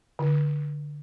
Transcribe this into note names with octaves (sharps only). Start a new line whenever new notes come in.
D3